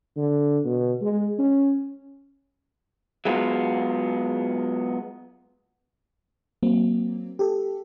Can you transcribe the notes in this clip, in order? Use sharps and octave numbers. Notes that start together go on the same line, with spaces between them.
D3
B2
G#3
C#4
F#3 G#3 B3 F4
F#3 A#3 C4
G4 A4